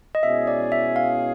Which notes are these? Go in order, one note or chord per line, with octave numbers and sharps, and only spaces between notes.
D#5
B2 G#3 C#4 E4 G#4 E5
D5
E5
F5